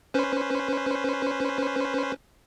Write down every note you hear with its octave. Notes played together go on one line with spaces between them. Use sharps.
C#4 B4 C5